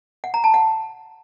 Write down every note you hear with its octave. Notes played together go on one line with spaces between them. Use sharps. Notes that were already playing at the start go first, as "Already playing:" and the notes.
F#5
A#5
A5
F#5